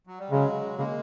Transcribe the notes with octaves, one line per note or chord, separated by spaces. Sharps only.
F#3
G3
C#3 F#3 G#3
C#3 G#3 A#3